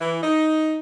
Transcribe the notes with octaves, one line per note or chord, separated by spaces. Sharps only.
E3
D#4